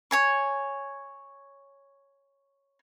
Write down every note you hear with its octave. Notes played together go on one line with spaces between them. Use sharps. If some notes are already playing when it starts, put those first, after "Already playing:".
C#5 G#5 C#6